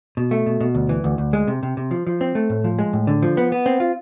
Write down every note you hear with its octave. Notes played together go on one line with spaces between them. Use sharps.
B2
A3
B2
B2
D2
E3
D2
D2
G#3
C3
C3
C3
F3
F3
C4
A3
A2
F3
G#3
A2
D3
F3
B3
B3
C4
F4